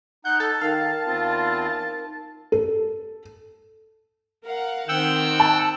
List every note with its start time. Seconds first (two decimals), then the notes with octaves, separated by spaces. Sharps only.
0.25 D#4 F#5 G6
0.40 A4 A5
0.61 D#3 D#4 A#4 F5
1.07 E2 C4 F4
2.52 A4
4.44 A#4 F5 F#5
4.88 D#3 C4 F#5 G5 E6
5.40 A5